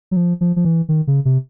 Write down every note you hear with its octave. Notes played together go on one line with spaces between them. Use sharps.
F#3
F3
F3
F3
E3
D#3
C#3
C3